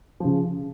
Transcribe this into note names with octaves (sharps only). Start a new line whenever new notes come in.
C#3 F3